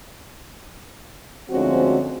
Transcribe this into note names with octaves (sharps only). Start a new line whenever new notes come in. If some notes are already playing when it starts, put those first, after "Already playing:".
D2 F3 G#3 C4 C#4 F#4